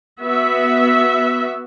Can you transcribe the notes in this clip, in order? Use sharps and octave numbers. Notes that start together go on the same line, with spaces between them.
B3 F#4 E5